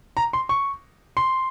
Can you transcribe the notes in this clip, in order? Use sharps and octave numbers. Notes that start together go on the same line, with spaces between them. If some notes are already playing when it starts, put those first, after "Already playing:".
A#5
C6
C#6
C6